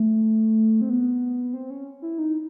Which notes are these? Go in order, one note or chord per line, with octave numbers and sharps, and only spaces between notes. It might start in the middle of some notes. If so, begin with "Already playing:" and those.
Already playing: A3
C4
B3
C4
C#4
E4
D#4